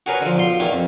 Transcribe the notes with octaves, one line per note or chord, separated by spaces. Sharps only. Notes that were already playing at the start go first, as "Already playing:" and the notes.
F#4 G#4 A#4 B4 C#5
D3 F3
B1 F3 C6
E2 D#3 A#3
F2